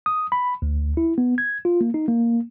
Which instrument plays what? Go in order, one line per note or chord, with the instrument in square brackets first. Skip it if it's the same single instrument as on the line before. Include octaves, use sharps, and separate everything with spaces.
[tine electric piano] D#6
B5
D2
E4
B3
G#6
F4
A#3
D#4
A#3